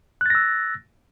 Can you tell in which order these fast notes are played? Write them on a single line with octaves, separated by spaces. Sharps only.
F#6 A6 A#6 E6